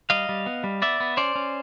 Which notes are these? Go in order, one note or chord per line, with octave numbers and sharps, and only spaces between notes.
G3 D#5 F5
G3
B3
G3
B3 D5 E5
B3
C#4 C5 D5
C#4